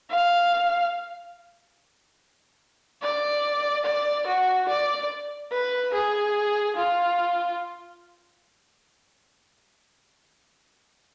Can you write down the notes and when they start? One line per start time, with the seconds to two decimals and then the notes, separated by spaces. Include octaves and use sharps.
0.10 F5
3.02 D5
3.85 D5
4.27 F#4
4.68 D5
5.52 B4
5.94 G#4
6.76 F4